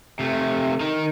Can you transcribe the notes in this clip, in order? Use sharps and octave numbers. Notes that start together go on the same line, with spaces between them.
C3 A3
D#3 D#4